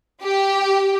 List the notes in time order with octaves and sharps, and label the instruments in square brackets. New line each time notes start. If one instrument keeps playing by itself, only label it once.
[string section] G4